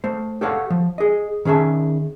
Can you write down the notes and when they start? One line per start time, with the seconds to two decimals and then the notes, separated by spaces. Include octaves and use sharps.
0.04 A3 C5
0.41 G4 A4 C#5 F5 F#5
0.70 F3
0.98 G#4 D#5
1.45 D#3 C#4 G#4 E5 A5